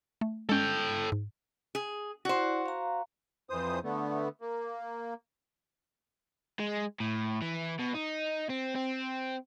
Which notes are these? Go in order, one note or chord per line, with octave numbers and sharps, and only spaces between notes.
A3
G#3 C#4 A4 G5
G#2
G#4
E4 F#4 C5 D5 F#5
F5 A#5
F2 E3 C5 D#6
D3 A3 B3
A#3
G#3
A2
E3
B2
D#4
C4
C4